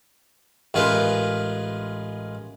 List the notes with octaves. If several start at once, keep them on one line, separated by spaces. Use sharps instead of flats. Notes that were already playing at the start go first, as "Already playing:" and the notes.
A1 G#3 F4 A#4 B4